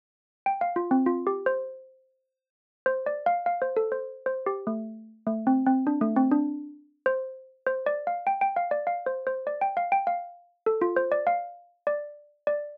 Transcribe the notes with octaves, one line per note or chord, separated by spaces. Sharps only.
G5
F5
F4
C4
F4
G4
C5
C5
D5
F5
F5
C5
A4
C5
C5
G4
A3
A3
C4
C4
D4
A3
C4
D4
C5
C5
D5
F5
G5
G5
F5
D5
F5
C5
C5
D5
G5
F5
G5
F5
A4
F4
C5
D5
F5
D5
D5